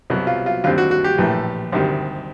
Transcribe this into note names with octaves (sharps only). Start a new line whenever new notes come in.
C2 B2 F#3
F4
F4
D#2 D3 G3 C4 F4
F#4
F#4
G4
A#1 A2 E3 A3
D2 C3 D#3 G3